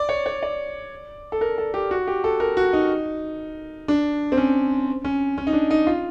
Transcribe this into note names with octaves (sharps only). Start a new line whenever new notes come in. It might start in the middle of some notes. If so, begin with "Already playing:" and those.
Already playing: D5
C#5
C#5
D5
A4
A#4
A4
G4
F#4
G4
A4
A#4
F#4
D#4
D4
C4
C#4
C#4
C#4
D#4
D4
D#4
F4